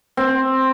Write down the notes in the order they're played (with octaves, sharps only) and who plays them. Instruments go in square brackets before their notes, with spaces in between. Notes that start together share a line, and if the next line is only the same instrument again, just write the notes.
[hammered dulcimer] C4